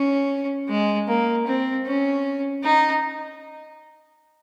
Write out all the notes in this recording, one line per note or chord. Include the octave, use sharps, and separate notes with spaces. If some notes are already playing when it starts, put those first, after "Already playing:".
Already playing: C#4
G#3
A#3
C4
C#4
D#4